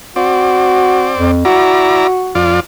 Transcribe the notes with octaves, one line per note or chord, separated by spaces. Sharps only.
C4 F#4 D5
F2
E4 F#4 D5 A#5
F2 F4 D5